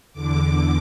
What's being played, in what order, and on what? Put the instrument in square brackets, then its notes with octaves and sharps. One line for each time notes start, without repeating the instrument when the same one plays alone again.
[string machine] E2 D3 D6